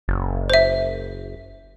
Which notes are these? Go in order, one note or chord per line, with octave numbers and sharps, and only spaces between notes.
F#1
C5 E5